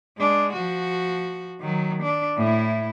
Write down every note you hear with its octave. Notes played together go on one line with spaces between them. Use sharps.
G#3 D4
F3 F#4
D#3 F#3
D4
A2 E4